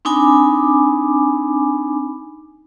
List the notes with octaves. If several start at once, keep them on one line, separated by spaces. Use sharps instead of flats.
C4 D4 D#4 G#5 B5 D6